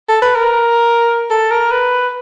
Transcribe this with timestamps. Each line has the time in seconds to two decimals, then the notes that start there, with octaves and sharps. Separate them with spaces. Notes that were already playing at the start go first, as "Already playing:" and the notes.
0.09 A4
0.22 B4
0.35 A#4
1.31 A4
1.52 A#4
1.71 B4